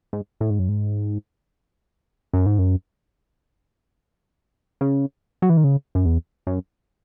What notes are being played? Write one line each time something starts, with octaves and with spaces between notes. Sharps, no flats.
G#2
A2
G#2
F#2
G#2
F#2
G#2
F#2
C#3
F#3
E3
D#3
C#3
F#2
E2
F#2